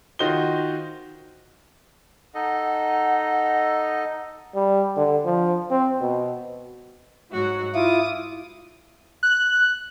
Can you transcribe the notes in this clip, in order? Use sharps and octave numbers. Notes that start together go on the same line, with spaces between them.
D#3 F4 F#4 C5 D#5 G7
D#4 A4 D#5 F#5
G3
D3
F3
C4
B2
G#2 F#3 F#4
E4 F4 D6 D#6
F#6